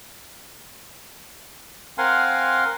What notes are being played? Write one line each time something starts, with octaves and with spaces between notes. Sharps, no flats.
C4 A#4 F5 F#5 G#5 C6